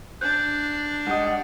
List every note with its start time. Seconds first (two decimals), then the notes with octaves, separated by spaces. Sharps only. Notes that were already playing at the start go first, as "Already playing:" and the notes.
0.21 D4 F#6 G6
1.07 G#2 G3 D#5 F#5